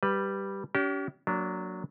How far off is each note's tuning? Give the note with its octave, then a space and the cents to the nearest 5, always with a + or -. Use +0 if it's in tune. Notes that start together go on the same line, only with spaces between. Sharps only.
G3 +0 B4 +0
C#4 +45 G4 -35
F#3 -5 A#3 -10 D4 -25